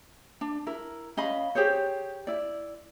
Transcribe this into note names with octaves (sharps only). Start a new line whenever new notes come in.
D4
E4 A#4
C#4 D#5 F5 B5
G4 G#4 C5 C#5
E4 D5